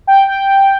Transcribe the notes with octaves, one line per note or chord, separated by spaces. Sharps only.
G5
G5